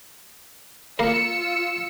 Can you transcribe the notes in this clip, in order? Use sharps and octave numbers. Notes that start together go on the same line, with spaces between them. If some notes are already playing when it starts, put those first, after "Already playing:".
A#3 F4 A#4 E6 C#7